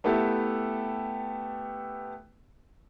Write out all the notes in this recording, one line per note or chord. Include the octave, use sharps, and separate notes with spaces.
A3 B3 E4 G4 A4